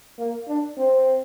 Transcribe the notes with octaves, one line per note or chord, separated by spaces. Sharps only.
A#3
D4
C4